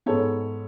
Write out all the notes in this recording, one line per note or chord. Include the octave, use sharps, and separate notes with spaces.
G#2 G#3 B3 A4 C#5